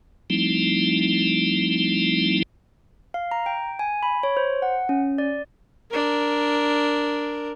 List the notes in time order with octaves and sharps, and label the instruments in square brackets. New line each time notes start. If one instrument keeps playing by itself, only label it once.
[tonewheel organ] F3 G3 A3 C4 D#4 E4
[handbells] F5
A#5
G5
G#5
B5
C#5
C5
F#5
C#4
D5
[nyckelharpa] D4 A#4